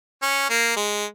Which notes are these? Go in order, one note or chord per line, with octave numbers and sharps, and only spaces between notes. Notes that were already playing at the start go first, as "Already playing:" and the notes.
C#4
A#3
G#3